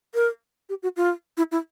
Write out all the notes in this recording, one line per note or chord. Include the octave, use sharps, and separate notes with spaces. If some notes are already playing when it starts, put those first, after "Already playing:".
A#4
G4
F#4
F4
E4
E4